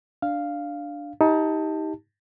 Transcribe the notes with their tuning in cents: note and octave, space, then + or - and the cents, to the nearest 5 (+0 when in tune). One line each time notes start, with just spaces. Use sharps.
D4 +0 F5 +0
D#4 +25 G4 +0 A5 +10